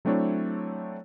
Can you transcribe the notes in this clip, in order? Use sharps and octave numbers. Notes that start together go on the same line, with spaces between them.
F#3 A3 C4 D4 E4 C#5